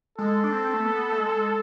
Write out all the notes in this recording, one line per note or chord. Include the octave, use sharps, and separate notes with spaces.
G#3 A4
D4
C4
A3
B3
A3
G#3